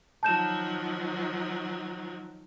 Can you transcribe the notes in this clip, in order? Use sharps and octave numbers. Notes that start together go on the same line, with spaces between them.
D#3 F3 F#3 A5 G6 E7